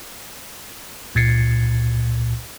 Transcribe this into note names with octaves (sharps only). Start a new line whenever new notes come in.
C#2 A#2 G#6 A6 C7 C#7